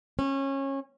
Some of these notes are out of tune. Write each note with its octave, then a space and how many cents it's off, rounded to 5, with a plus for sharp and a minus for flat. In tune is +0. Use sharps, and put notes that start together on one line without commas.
C#4 -25